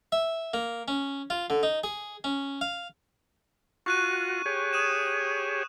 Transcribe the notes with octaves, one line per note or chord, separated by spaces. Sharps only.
E5
A#3
C#4
F4
D3
D#4
G#4
C#4
F5
F4 F#4 C#6 F#6 D#7
G4 G#4 C#5
D#6 D#7 E7